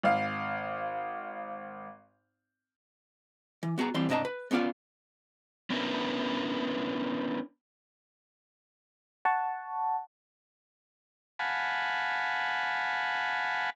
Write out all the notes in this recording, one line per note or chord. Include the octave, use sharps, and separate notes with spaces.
G#1 F5
E3
B3 F#4 G#4 A#5
E3 G3 C4 C6
C2 G2 D4 D#5 A5 A#5
B4
B3 C#4 F4 D5 F5
B3 C#4 D4 E4 A#4 B4
F#5 A5 C#6
F5 F#5 G#5 A5 B5